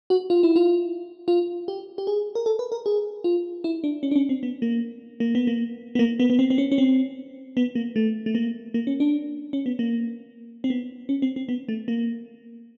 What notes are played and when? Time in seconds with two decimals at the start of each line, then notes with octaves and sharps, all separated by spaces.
0.10 F#4
0.30 F4
0.43 E4
0.56 F4
1.28 F4
1.68 G4
1.98 G4
2.07 G#4
2.35 A#4
2.46 A4
2.59 B4
2.72 A#4
2.86 G#4
3.24 F4
3.64 E4
3.84 D4
4.03 C#4
4.11 D4
4.16 C#4
4.29 C4
4.43 B3
4.62 A#3
5.20 A#3
5.35 B3
5.47 A#3
5.95 B3
5.99 A#3
6.20 B3
6.30 B3
6.39 C4
6.50 C4
6.58 C#4
6.72 C#4
6.78 C4
7.57 B3
7.75 A#3
7.96 A3
8.26 A3
8.35 A#3
8.74 A#3
8.87 C#4
9.00 D4
9.53 C#4
9.66 B3
9.79 A#3
10.64 C4
10.70 B3
11.09 C#4
11.22 C4
11.36 C4
11.49 B3
11.69 A3
11.88 A#3